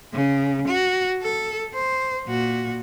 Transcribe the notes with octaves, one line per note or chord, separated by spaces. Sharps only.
C#3
F#4
A4
C5
A#2 F#4